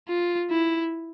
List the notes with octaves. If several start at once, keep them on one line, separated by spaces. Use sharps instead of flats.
F4
E4